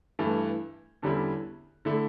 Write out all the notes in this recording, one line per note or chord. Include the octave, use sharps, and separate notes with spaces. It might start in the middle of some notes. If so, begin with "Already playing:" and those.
G2 E3 A3
E2 D3 G3 C#4 E4
D3 A3 E4